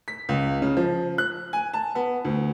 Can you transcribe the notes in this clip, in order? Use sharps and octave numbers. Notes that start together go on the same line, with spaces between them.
B6
C#2
C#3
F3
F#6
G#5
A5
B3
D2